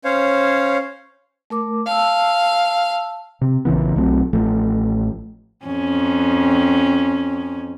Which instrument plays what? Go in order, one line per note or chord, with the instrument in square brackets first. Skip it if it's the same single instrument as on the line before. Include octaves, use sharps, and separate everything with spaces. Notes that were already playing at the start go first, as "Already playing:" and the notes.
[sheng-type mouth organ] C#4 C5 C#5 F5
[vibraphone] A3 A#4 D6
[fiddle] F5 [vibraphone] A5 E6
[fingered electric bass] C3
A#1 C#3 E3 B3
B1 F#3 A3 C4
A1 F3 A3
[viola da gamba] F2 C#4